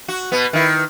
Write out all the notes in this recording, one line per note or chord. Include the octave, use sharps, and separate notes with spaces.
F#4
B2 B3
D#3 E4